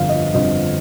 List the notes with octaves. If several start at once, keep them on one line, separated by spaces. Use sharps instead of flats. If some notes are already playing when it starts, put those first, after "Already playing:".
Already playing: G1 F2 D3 F3 F5
D#5
G1 F2 D3 F3 D#5